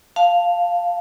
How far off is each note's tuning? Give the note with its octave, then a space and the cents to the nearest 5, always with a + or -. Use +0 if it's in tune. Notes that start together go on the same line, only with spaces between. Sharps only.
F5 +0 A5 +0